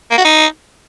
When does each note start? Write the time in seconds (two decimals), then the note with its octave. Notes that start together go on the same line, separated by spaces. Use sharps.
0.11 A#3
0.18 F#4
0.25 D#4